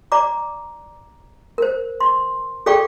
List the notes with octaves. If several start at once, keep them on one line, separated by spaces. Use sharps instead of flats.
D5 A#5 D6
A#4 C5
C6
G#4 A4 D5 F5 G5 C#6